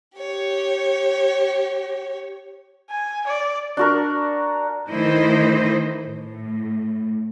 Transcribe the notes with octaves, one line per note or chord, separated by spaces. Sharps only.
G4 C#5
G#5
D5
D4 F#4 A#4
D#3 E3 A3 E4 C5 D#5
A2